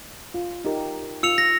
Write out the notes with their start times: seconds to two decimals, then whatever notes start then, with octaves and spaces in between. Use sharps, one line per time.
0.34 F4
0.65 D#4 G4 A#4
1.23 F4 E6 C#7 F7
1.38 A#6